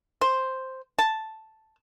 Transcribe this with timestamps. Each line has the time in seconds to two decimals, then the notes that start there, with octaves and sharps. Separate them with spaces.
0.21 C5
0.99 A5